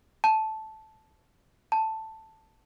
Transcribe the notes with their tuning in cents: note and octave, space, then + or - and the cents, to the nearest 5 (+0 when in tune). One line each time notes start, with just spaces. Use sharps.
A5 -10
A5 +5